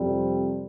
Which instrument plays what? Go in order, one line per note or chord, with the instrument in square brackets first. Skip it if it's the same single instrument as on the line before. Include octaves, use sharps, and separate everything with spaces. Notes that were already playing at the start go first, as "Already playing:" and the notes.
Already playing: [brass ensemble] F2 C3 G3